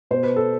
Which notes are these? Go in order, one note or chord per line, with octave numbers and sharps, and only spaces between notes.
B2 C5
B4
A4